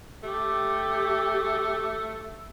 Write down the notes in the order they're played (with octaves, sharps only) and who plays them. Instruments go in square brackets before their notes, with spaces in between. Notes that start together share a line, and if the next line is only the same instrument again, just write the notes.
[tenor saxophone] A3 [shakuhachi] G4